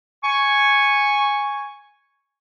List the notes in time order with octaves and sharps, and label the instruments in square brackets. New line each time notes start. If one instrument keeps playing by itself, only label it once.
[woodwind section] G#5 C#6